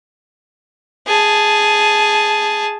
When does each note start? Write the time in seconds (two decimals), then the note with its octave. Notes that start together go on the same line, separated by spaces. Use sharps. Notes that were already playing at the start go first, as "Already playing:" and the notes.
1.07 G#4 A5